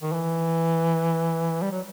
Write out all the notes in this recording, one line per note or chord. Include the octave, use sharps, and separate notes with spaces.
D#3
E3
G3
F#3